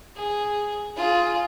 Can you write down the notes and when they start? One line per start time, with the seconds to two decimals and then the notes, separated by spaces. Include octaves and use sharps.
0.16 G#4
0.97 F4 G#4